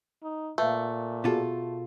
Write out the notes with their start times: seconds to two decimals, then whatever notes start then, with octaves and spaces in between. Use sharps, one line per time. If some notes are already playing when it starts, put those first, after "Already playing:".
0.23 D#4
0.58 A#2 A3 B4 E5 F5
1.24 B2 F4 F#4 G#4 A4